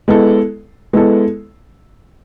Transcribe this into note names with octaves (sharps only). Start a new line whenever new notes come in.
G#3 B3 E4 A4
G#3 B3 E4 A4